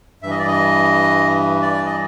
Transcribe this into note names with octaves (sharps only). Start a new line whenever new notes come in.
G2 E3 E5
D#5
D5
D#5
D5
D#5